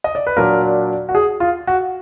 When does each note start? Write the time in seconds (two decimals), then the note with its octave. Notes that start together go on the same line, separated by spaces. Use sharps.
0.04 D#5
0.15 D5
0.27 B4
0.37 A#2 F#3 D4 A#4
1.09 F#4
1.15 G#4
1.40 F4
1.67 F#4